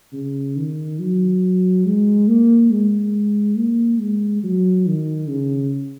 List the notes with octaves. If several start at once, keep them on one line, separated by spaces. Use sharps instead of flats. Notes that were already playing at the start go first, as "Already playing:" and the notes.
C#3
D#3
F#3
G#3
A#3
G#3
A#3
G#3
F#3
D#3
C#3